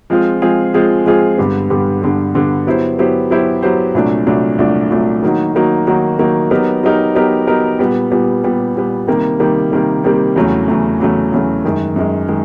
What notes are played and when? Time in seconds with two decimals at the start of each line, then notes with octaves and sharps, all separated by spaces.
0.10 F3 G#3 C4 F4 G#4
0.42 F3 G#3 C4 F4 G#4
0.74 F3 G#3 C4 F4 G#4
1.05 F3 G#3 C4 F4 G#4
1.38 G2 D3 G3 B3
1.70 G2 D3 G3 B3
2.02 G2 D3 G3 B3
2.35 G2 D3 G3 B3
2.67 F#3 B3 E4 G4 C5
2.98 F#3 B3 E4 G4 C5
3.30 F#3 B3 E4 G4 C5
3.62 F#3 B3 E4 G4 C5
3.95 C2 A#2 F#3 A3 D4
4.26 C2 A#2 F#3 A3 D4
4.58 C2 A#2 F#3 A3 D4
4.90 C2 A#2 F#3 A3 D4
5.23 D#3 F#3 A#3 D#4 F#4
5.55 D#3 F#3 A#3 D#4 F#4
5.87 D#3 F#3 A#3 D#4 F#4
6.19 D#3 F#3 A#3 D#4 F#4
6.51 F#3 B3 D#4 G4 A#4
6.83 F#3 B3 D#4 G4 A#4
7.15 F#3 B3 D#4 G4 A#4
7.47 F#3 B3 D#4 G4 A#4
7.79 A#2 G3 B3
8.11 A#2 G3 B3
8.44 A#2 G3 B3
8.75 A#2 G3 B3
9.07 C3 D#3 G3 A#3
9.40 C3 D#3 G3 A#3
9.72 C3 D#3 G3 A#3
10.04 C3 D#3 G3 A#3
10.36 E2 C#3 F#3 A3
10.68 E2 C#3 F#3 A3
11.00 E2 C#3 F#3 A3
11.32 E2 C#3 F#3 A3
11.64 F#2 D#3 G#3
11.96 F#2 D#3 G#3
12.29 D#3 G#3